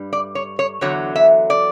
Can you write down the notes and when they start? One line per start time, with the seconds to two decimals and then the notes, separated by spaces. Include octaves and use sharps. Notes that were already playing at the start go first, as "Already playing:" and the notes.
Already playing: G2 G3
0.13 D5
0.35 C#5
0.59 C#5
0.81 E2 D3 F#3 C#5
1.16 E5
1.50 D5